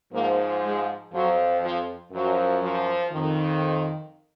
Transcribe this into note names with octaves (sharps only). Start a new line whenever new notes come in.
G#2 F3 A#3
G#3
F2 F3 F#3
F3
F#2 F3 F#3
F3
F2 D#3